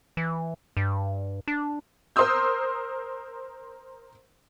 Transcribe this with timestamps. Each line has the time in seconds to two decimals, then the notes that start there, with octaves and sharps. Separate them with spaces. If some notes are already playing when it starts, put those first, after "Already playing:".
0.17 E3
0.77 G2
1.48 D4
2.16 A#4 C5 C6 D#6 E6 G6